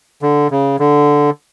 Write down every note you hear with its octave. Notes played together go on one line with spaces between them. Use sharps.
D3
C#3
D3